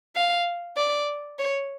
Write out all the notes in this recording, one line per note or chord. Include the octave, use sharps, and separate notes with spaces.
F5
D5
C#5